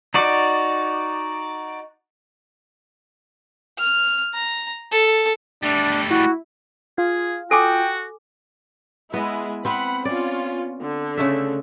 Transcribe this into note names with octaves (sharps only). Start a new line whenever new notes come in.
D#4 F#4 D5
F6
A#5
A4
G3 A3 D4
E4 F#4
F4 G#4
F#4 A4 G5 G#5 D6
G#3 B3 E4 D#5
B3 C4 F#5 B5
C#4 F4 D5
D3
C#3 A3 E5